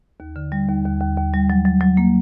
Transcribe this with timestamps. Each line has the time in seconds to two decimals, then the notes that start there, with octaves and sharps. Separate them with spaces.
0.20 D#2
0.36 D3
0.52 G3
0.69 D#2
0.85 D#2
1.00 D#2
1.17 D#2
1.33 G3
1.50 F#3
1.65 F#3
1.81 F#3
1.97 A#3